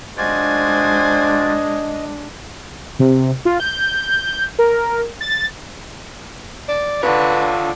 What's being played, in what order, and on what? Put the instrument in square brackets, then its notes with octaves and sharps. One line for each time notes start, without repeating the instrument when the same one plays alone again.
[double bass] G#3 D4 [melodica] F4 F#4 D5 [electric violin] C5 G#5 [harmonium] D#5
[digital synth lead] C3
F4
G6
A#4
A6
[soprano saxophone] D5
[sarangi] D3 [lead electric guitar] F4 C#5 [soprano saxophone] B4